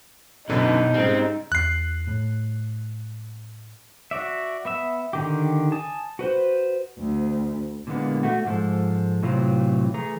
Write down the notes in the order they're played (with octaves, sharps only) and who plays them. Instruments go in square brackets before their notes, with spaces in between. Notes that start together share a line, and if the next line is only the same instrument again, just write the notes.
[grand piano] F#2 D3 E3 [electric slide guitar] B2 [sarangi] D#4
[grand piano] G#2 C#3 G3 [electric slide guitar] C4
[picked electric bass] E2 [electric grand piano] F#6 C7
[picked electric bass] A2
[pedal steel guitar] F#4 D5 E5
B3 E5 E6
D3 D#3 G4
G#5 A5 D#6
F#4 B4 C5
[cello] D2
[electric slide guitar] A#2 D3 E3 G#3 A#3 B3
A3 F#4
G#2 F3 G#3 A4
A2 C3 E3 F#3 F4
E3 A3 G#4 A#5